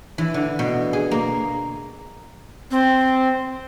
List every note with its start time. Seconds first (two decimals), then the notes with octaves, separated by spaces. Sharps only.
0.18 E3
0.34 D3
0.59 B2
0.93 G#4
1.11 A#3
2.70 C4